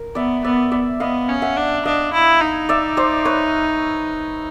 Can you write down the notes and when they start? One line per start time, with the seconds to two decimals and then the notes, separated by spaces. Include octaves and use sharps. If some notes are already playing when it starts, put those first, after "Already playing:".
Already playing: A#4
0.15 B3 D5 E5
0.44 B3 D5 E5
0.72 D5 E5
1.00 B3 D#5 F5
1.29 C#4
1.42 E5 F#5
1.57 D4
1.85 D4 D#5 F5
2.13 E4
2.41 D#4
2.69 D5 E5
2.97 C5 D5
3.25 B4 C#5